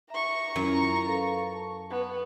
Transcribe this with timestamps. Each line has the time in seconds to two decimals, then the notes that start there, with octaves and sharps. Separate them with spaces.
0.10 E5 A#5 C#6
0.56 F#2 C#4 E4 F4
1.06 A4 B4 F5
1.53 A5 C#6
1.91 B3